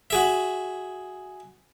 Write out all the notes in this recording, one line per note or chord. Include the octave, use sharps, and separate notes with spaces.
F#4 G#4 E5